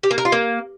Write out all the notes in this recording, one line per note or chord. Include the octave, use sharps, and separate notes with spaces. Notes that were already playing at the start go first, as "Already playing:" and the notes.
G4
A#3
A#4
F4
A#3